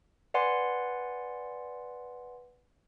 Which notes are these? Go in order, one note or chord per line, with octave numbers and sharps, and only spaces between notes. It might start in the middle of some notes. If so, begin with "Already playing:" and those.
B4 D5 F#5 G#5 C6